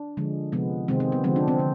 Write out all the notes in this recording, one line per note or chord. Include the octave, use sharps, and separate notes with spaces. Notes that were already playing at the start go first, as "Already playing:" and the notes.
Already playing: D4
D3 F3 G#3
C3 F3 G#3 B3
C3 D#3 G#3 C4
C4
B3
D3 F3 G#3 C4
D4
C4
D3